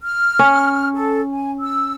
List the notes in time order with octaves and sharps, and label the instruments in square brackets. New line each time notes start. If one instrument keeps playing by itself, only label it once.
[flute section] F6
[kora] C#4
[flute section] A4
G#5
E6